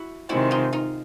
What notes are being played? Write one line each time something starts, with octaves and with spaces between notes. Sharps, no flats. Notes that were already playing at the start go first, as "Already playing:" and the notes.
Already playing: E4 F#4
C3 D#3 G#3 C4 E4 F#4
D#4 F4
D#4 F4